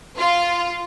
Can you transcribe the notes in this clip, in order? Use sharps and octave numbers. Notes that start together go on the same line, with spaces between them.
F4